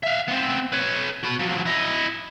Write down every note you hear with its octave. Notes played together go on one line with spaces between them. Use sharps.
E5 F5
B3 C4
B4 C#5
F#4 B5
F3 F#3
E4 D#5